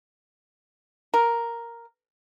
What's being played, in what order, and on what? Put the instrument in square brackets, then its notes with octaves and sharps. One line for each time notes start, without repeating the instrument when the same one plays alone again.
[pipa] A#4